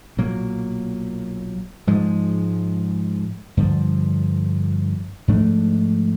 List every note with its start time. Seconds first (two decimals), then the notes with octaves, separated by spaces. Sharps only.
0.17 B1 A#2 F#3 A#3
1.87 G#2 F3 G#3
3.57 G2 D3 F3
5.28 G#2 F3 A3 D4